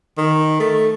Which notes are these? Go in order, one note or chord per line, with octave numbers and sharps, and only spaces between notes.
D#3
A3